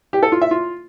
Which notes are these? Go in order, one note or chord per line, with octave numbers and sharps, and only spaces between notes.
G4
A4
F4
E5
F4